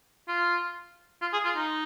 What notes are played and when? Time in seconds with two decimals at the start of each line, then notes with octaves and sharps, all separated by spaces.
0.28 F4
1.22 F4
1.33 G#4
1.45 F4
1.56 D#4